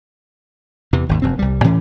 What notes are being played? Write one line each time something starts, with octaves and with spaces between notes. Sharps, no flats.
E2 C3 E3
G#1 D#2 G#2
F1 F#2 C4
C2 G3
D2 A2 E3 C#4